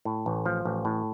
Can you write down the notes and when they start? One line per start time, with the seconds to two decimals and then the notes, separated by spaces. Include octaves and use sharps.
0.05 A2
0.26 A1
0.46 F3
0.65 A1
0.85 A2